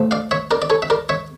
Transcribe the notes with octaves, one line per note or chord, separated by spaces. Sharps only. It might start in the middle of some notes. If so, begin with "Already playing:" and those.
Already playing: A2 F3 A3
D5 F5
C#5 E5
A#4 D5
D5
A4 C#5
E5
A#4 D5
C#5 E5